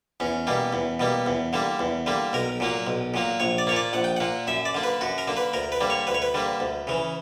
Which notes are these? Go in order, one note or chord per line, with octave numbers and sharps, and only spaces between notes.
E2 C#4
B2 G3 A#3
E2
B2 G3 A#3
E2
D3 G3 A#3
E2
D3 G3 A#3
B1 A#4
A#2 F#3 A#3
B1
A#2 F#3 A#3
A#1 C#5
D5
A#2 A#3 C#5 D5
A#1 F#5
G5
A#2 A#3 F#5
F#2 E5
D5
D3 A#3
B4
F#2 F#4
A#4
D3 A#3
B4
D2 A#4
B4
D3 G3 A#3
C#5
D2 B4
C#5
B4
D3 G3 A#3
D2
C#3 E3